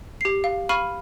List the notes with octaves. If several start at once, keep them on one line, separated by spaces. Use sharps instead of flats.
G4 C7
F5
F5 B5 C#6 F6 D#7